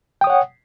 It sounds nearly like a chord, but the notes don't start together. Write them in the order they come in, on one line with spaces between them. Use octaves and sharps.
G5 D#6 C#5 F#5